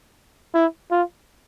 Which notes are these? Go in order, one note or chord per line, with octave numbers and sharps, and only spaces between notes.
E4
F4